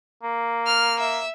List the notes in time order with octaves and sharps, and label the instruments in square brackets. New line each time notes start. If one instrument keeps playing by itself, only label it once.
[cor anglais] A#3
[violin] F6
E5